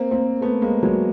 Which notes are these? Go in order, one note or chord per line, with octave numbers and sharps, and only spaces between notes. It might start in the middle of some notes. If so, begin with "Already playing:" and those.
Already playing: A#3 C4
A#3 C4
A3 B3
G#3 A#3
F#3 G#3